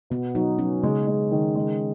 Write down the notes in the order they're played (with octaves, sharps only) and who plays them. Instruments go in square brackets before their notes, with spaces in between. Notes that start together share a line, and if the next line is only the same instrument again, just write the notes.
[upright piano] B2 [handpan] B3
[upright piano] F#3 [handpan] D#4
[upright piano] F#3 [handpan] C#4
[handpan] C#3 [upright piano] G#3
[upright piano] G#3
D#3
G#3